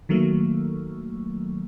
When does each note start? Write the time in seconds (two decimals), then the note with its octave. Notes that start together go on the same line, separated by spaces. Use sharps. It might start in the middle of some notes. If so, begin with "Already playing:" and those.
0.09 D#3 F#3 A3 A#3